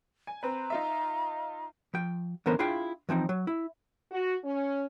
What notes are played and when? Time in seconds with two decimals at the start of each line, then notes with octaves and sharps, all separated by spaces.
0.27 G#5
0.43 C4 B4 A#5
0.70 D#4 F4 E5
1.94 F3 G5
2.46 D3 E3 B3 C#4 A#4 C5
2.59 D4 E4 F4 G#4 F5 G5
3.09 E3 F3 C4 D#4
3.29 F#3
3.47 E4
4.11 F#4
4.44 C#4